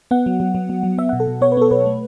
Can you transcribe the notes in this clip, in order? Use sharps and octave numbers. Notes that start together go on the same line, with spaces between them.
B3 F#5
F#3
F#3
F#3
F#3
F#3
B3 E5
B2 F#5
A4
B2
B3 C#5
B4
B3 A4
B2 B4
A3